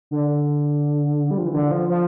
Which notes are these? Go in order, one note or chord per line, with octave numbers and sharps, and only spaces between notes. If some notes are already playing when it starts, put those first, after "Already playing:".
D3
G3
F3
E3
D3
F3
F3